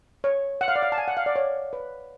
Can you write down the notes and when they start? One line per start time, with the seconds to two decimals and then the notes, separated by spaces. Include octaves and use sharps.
0.24 C#5
0.61 F#5
0.68 F5
0.76 D5
0.83 F5
0.92 A5
0.98 G#5
1.08 F#5
1.17 F5
1.26 D5
1.36 C#5
1.73 B4